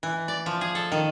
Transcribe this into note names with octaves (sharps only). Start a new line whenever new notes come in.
E3
D5
F3
G#4
A4
D#3